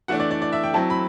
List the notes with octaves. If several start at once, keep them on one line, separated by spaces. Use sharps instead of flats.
E3 A3 D4 F#5
D5
D5
D5
E5
G5
F#3 C4 E4 A5
B5